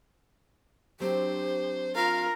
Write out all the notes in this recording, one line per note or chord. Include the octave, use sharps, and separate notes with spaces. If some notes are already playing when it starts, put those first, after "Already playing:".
F#3 C4 D4 G4 C5
F4 A#4 F5